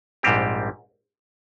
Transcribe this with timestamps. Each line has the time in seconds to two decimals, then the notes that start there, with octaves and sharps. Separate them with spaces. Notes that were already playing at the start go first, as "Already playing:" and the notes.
0.23 A#1 G#2 G3 C4 G4